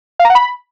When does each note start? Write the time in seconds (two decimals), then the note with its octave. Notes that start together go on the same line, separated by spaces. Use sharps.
0.19 F5
0.25 A#5
0.30 F#5
0.35 B5